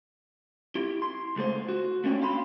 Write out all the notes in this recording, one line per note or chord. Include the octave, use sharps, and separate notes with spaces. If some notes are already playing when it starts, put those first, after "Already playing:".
E4 G4
C6
C#2 A3 G#4 C5
F#4
A3 A#3 C#4 D4 C#5 G5
F5 G5 B5 C6